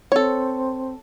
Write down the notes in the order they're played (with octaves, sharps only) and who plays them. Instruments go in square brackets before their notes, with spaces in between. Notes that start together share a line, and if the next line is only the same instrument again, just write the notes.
[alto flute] C4 [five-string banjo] A4 C#5